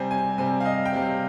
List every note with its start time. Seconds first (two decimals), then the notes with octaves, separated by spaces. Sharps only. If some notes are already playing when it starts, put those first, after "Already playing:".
Already playing: C3 G3 C4 G#5
0.11 G#5
0.38 C3 G3 C4 G#5
0.60 F5
0.65 D#5
0.86 G5
0.93 C3 G3 C4 F5